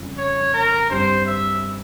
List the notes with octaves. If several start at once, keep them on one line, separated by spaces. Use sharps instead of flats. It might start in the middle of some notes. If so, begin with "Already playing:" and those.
Already playing: F2 C#3 G3 C#4 F4
C#5
A#4
G2 G3 C4 G4 C5
E5